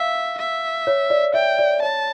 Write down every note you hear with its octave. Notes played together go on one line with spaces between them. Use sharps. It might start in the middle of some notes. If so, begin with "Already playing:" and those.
Already playing: E5 F5
E5
C#5
D5
E5 G5
D5
C#5 A5